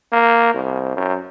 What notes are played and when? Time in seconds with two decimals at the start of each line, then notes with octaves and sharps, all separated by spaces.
0.12 A#3
0.54 C2
0.96 F#2